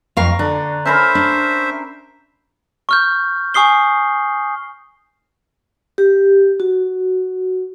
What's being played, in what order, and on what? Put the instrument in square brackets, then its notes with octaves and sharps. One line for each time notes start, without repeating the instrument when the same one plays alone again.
[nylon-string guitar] F2 F5 [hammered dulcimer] A#5 C#6
[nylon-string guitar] D3 [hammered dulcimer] D4
[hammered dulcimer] C#4 A#4 B5 [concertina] C5 E5
[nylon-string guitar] D4
[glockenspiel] C#6 F6 G6
G#5 C#6 D#6 C7 G7
[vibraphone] G4
F#4